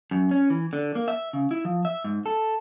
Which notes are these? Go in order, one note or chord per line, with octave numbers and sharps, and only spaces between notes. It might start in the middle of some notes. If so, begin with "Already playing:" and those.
F#2
C#4
E3
D3
A#3
E5
C#3
E4
F3
E5
G#2
A4